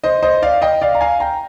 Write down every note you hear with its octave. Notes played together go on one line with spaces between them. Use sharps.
C5 D#5
C5 D#5
D5 F5
D#5 G5
D5 F5
A#5
F5 G#5
G5 A#5